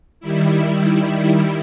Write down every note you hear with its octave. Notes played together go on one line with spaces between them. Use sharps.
D#3 G3 E4